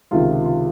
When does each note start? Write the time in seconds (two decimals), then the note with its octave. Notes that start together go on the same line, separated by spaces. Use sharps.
0.11 C#2 C3 D#3 F4
0.46 F4